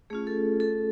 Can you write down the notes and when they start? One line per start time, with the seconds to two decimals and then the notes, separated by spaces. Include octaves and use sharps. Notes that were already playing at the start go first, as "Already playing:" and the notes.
0.10 A3 C#4 F4 G#4
0.27 A4
0.60 A4